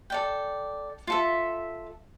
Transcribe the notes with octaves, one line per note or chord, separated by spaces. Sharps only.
A4 D5 G5
F4 A4 E5